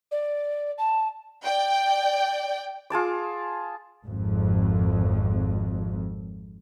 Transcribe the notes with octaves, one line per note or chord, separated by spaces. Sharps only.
D5
A5
D5 G5
F4 G#4 A5 D6
G#1 F2